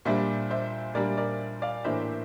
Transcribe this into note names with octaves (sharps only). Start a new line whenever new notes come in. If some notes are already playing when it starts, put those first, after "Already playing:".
A#2 G3 D4 C5 E5
C5 E5
A#2 G3 D4 A#4 D5
A#4 D5
D5 F5
A2 E3 A#3 D4 C5 E5